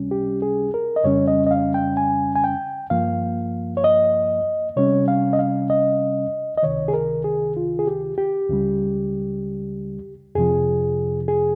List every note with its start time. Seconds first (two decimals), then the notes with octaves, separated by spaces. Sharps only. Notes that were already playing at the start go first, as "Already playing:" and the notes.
Already playing: C#2 C3 G3 C#4
0.11 G4
0.42 G#4
0.74 A#4
0.96 D#5
1.04 F2 C#3 G3 C#4 C#5
1.28 D#5
1.47 D#5
1.51 F5
1.74 G5
1.97 G#5
2.35 G#5
2.44 G5
2.90 G2 F3 A#3 F5
3.77 C#5
3.84 D#5
4.76 C3 G3 C#4 C#5
5.08 F5
5.33 D#5
5.39 F5
5.70 D#5
6.57 D#5
6.63 C#2 C3 D#3 C#5
6.88 G#4
6.93 A#4
7.24 G#4
7.57 F4
7.79 G#4
7.87 G4
8.18 G4
8.49 C#2 C#3 G3
10.35 F2 C3 F3 G#4
11.28 G#4